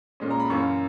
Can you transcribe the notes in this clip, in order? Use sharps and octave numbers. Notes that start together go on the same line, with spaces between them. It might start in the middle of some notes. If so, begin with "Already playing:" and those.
A#2 G#3 C#4
A#5
B5
F#2 E3 A#3 C#4 C#6